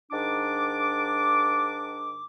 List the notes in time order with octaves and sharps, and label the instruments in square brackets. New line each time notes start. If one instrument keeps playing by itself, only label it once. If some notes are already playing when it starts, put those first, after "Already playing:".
[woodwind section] G#2 D#3 D4 D6